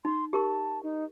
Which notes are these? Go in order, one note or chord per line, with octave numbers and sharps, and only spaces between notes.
D#4 C6
G4 A#4 A5 C#6
D#4